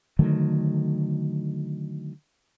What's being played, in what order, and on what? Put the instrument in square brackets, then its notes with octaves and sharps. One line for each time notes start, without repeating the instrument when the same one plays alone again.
[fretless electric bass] D3 D#3 F#3 A3